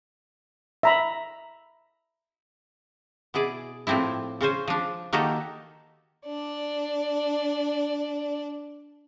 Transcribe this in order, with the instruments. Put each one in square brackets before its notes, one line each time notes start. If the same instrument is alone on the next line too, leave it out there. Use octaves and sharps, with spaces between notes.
[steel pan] E5 A#5 B5
[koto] B2 E4 G#4 D5
A2 F3 C4 D4 E4
C#3 C#4 C5 G#5
F3 D4
D#3 A#3 D#4 F#4 G4 A4
[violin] D4 D5